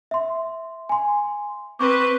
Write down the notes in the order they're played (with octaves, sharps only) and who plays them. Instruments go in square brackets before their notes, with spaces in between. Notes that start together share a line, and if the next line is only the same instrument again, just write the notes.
[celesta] E5 C6
G#5 C6
[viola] C4 B4 [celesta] C#6 D6